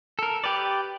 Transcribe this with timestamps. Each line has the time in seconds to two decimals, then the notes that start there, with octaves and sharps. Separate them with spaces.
0.19 A4 A#4
0.44 G4 B4 D5